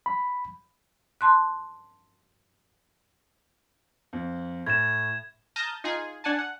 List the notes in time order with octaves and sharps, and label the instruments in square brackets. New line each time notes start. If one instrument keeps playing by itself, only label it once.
[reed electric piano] B5
[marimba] A5 C6 F#6
[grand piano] F2
[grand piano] A2 [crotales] G#6 E7
[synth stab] A5 A#5 D#6 F6 G6 A#6
D#4 F4 G#4 G#5
D4 F#5 G#5 A5
F#5